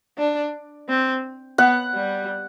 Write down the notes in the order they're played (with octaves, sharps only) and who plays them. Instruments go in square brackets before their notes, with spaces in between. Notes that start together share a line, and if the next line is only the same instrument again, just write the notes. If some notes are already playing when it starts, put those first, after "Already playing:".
[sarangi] D4
C4
[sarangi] B3 [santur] F#5
[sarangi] G3